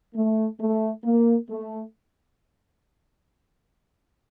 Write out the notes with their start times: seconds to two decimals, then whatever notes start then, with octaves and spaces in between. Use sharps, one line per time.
0.15 A3
0.60 A3
1.04 A#3
1.49 A3